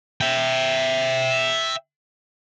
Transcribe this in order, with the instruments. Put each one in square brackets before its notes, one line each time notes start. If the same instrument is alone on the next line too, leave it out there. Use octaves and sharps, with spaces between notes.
[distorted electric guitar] E5 G5